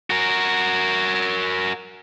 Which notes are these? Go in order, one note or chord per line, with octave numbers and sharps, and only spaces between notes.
F#4 A#4